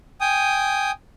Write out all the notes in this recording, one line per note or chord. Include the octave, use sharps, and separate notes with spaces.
G5 G#5 D#6